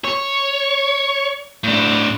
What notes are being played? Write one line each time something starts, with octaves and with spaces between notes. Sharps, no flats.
C#5
A2 D4